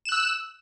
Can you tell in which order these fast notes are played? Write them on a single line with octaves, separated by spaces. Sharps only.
E7 F#6 E6